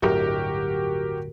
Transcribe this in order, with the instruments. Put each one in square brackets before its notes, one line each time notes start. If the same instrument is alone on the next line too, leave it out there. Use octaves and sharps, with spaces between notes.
[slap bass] D1 G1 F#3 [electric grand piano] F#4 G4 A#4